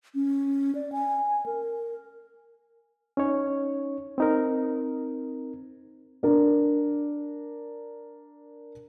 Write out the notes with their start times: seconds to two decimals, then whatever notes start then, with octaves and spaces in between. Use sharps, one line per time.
0.15 C#4
0.75 D5
0.92 G#5
1.46 A#4
3.17 C#4 D#4 C#5
4.18 C4 D#4 A#4
6.23 D4 A#4 D5